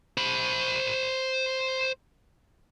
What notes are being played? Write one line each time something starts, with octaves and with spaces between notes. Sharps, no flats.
C5 B5